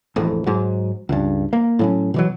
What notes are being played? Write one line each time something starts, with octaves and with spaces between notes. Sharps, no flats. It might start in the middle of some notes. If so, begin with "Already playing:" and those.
E1 A1 F2
G#2 F#3
C#2 G2
A#3
A2 F#3 C#4
B2 E3 F#3